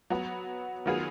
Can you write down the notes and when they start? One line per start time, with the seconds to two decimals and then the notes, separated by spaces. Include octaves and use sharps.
0.10 F#3 B3 F#4
0.86 D#3 F#3 B3 F4 G#4